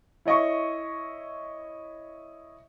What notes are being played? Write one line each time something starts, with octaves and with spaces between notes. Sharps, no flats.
E4 C#5 D#5 E5 C#6